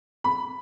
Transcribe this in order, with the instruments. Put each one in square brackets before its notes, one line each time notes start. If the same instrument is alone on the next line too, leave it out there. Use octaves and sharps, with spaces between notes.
[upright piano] B5